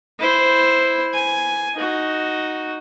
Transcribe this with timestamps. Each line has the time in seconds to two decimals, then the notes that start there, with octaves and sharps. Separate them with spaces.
0.20 E4 C5
1.13 G#5
1.75 D#4 F#4